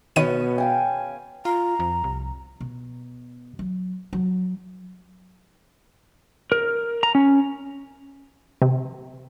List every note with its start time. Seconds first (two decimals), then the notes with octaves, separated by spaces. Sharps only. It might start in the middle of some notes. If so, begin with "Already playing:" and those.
0.16 B2 D#3 B3 C#4 D#7
0.58 F5 G5 G#5
1.45 F4 A#5
1.79 F2
2.04 C2
2.60 B2
3.59 F#3
4.13 F#3
6.52 A#4
7.03 A#5
7.15 C#4
8.62 C3